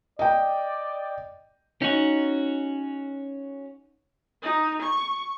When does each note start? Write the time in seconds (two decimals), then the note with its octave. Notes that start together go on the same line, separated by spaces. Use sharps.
0.19 D5 D#5 G5
1.82 C#4 D#4 F#4
4.42 D#4
4.82 C#6